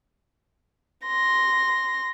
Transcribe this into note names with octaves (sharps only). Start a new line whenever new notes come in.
C6 A#6